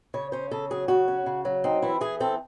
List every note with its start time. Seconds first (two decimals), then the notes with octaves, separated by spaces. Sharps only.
0.14 C#3 C#5
0.32 C#4 C5
0.51 C#3 A4
0.71 F#3 G#4
0.88 C#3 F#4
1.08 C#4
1.26 C#3
1.45 F#3
1.64 C4 D#4
1.82 E3 E4
2.01 E3 G#4
2.20 C4 A4